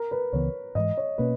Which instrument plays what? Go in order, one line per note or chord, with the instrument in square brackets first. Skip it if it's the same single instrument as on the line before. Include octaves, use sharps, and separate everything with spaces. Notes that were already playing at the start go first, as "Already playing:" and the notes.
Already playing: [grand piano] A#4
B4
[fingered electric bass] C#2 C#3 E3 B3 [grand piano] C#5
[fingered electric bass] G#2 E3 G#3 [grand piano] D#5
[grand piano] C#5
[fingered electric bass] B2 A#3 C#4 [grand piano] B4